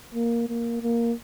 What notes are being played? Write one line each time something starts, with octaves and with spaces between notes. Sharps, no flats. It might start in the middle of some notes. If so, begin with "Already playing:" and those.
A#3
A#3
A#3